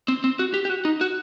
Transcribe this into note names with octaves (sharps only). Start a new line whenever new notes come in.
C4
C4
F#4
G4
G4
F#4
D#4
F#4